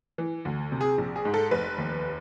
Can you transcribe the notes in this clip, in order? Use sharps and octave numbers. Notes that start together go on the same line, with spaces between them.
E3
D2
C3
G#4
A#1
G#4
G#2
A4
F1 B4
D#2